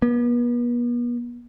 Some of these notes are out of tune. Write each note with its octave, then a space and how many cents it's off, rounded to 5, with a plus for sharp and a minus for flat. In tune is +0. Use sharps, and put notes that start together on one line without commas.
B3 -40